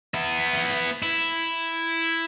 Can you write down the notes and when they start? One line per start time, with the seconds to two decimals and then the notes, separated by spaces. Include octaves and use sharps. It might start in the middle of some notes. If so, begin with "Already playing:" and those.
0.14 B3 E5
1.02 E4